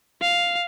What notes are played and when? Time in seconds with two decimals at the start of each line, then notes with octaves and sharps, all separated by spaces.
0.22 F5